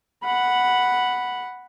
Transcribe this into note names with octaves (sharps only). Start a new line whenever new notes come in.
F#5 B5